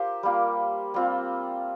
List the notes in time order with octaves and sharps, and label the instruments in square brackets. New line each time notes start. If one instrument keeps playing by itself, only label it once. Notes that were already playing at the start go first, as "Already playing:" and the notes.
Already playing: [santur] F4 G4 A#4 C5
G3 A#3 F4
G3 C4 F4